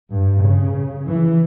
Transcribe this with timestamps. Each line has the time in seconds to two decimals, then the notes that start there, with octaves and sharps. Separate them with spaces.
0.11 G2
0.41 C#3
1.06 E3